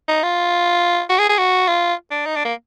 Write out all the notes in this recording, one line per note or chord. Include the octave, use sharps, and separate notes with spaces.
D#4
F4
F#4
G#4
G#4
F#4
F4
D4
D#4
D4
A#3